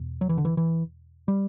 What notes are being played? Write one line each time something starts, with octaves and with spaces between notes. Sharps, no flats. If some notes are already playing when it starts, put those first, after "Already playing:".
Already playing: E2 B2
F#3
E3
D3
E3
E3
G3